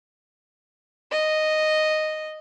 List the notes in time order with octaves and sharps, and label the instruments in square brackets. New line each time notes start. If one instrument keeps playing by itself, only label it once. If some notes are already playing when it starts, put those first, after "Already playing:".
[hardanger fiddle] D#5